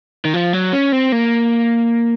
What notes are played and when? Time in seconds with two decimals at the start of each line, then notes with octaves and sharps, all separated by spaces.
0.25 D#3
0.34 F3
0.53 F#3
0.73 C#4
0.92 C4
1.12 A#3